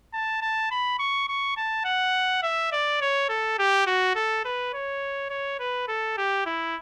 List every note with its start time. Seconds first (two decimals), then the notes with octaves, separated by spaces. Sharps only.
0.13 A5
0.42 A5
0.71 B5
0.99 C#6
1.29 C#6
1.57 A5
1.85 F#5
2.43 E5
2.72 D5
3.01 C#5
3.29 A4
3.59 G4
3.87 F#4
4.15 A4
4.45 B4
4.74 C#5
5.30 C#5
5.60 B4
5.88 A4
6.18 G4
6.46 E4